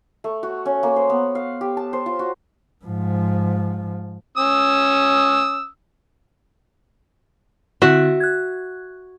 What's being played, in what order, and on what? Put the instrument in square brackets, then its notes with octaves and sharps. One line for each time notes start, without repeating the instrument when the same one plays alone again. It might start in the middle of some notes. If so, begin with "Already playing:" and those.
[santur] A3
F#4
C#4
A#3
C5
B3
F5
G4
A5
C5
F4
F#4
[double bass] G#2 F3
[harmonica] C#4 D#6 E6
[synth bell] D3 C4 E4 [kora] F#4 E5 F#5
[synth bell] F#6 G#6